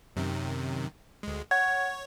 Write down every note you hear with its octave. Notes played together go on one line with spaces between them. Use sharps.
F#2 C3 D#3
D2 G#3
C#5 F#5 G#6